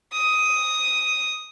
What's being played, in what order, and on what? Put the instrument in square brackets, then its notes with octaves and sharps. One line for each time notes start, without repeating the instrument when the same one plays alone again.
[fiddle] D#6